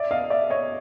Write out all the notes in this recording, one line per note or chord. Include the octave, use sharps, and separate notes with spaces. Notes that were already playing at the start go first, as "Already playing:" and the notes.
Already playing: D5 E5
D#5 F5
D5 E5
C#5 D#5